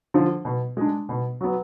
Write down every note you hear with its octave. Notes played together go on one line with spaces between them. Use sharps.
D3 F3
B2
G#3 D4
B2
F#3 B3